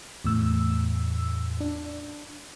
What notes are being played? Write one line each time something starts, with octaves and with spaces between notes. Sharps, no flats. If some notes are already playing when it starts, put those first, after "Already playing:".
E2 A2 E6
D4